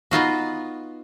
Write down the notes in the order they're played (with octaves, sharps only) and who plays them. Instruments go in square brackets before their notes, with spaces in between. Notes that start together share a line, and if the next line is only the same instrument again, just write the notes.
[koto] B3 D#4 F4 F#4